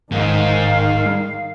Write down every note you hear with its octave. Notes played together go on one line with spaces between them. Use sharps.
D1 G#2 D#3 F5